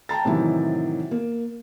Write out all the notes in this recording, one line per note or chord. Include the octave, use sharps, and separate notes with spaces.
G5 A5 A#5 A6
A2 C3 D#3 E3 F#3 E4
A#3